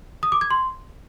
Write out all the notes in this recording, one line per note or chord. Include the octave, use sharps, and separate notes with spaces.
D#6
D6
G#6
C6